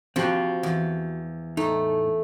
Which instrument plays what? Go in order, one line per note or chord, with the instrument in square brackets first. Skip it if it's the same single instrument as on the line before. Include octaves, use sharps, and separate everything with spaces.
[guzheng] F3 [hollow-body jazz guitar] C4 F#4 G4
[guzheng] E2
[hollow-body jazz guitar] A2 D#4 [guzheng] A3